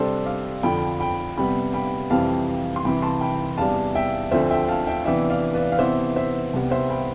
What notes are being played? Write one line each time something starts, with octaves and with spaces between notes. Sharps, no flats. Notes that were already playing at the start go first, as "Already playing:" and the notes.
Already playing: C3 G3 D4 A4 C5
D5 F5
F2 D3 F3 G5 B5
G5 B5
C3 G3 B3 G5 B5
G5 B5
F2 C3 E3 G3 C4 F5 A5
C6
C2 C3 E3 G5 B5
A5 C6
G5 B5
E2 C3 G3 D4 F5 A5
E5 G5
D2 D3 F3 A3 C4 C5 E5
E5 G5
F5 A5
E5 G5
C3 E3 B3 D4 E5 G5
D5 F5
B4 D5
F5
C3 E3 B3 C5 E5
C5 E5
C2 C3 G3 B3
C5 E5
G5 B5